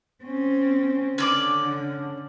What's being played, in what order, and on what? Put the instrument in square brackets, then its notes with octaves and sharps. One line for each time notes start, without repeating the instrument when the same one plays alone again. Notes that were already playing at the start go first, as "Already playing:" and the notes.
[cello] C4 C#4
[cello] D3 [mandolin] C#4 D5 D6